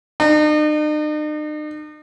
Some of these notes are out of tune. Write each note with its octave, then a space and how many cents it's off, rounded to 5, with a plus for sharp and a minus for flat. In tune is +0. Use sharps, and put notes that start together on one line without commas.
D#4 -45